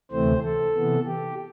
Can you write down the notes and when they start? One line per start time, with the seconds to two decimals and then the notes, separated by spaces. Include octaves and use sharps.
0.11 D2 C3 E3 A3 C4 C5
0.43 A4
0.75 C3 E3 B3
1.06 G4